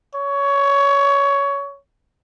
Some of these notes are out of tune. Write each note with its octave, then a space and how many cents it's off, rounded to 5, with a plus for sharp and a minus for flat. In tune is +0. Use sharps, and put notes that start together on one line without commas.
C#5 +15